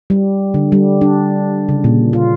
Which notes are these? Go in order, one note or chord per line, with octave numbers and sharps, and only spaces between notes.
G3
D3
G3
D4
C#3
A#2
F4